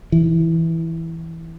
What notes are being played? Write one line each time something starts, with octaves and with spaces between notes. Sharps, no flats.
E3